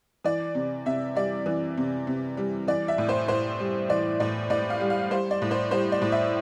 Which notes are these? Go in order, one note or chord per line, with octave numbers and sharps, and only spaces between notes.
E3 D5
C3
C3 E5
G3 D5
E3
C3
C3
G3
E3 D5
E5
A2
C5
A2 C5
G3
E3 D5
A2 D5
A2 D5
F5
G3
F5
G3 C5
D5
A2
C5
G3 C5
D5
A2
E5